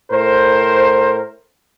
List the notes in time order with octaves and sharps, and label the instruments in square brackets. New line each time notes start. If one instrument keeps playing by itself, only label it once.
[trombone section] A2 A#4 C5